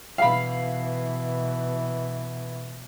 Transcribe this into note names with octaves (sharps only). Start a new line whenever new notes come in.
B2 E3 F5 B5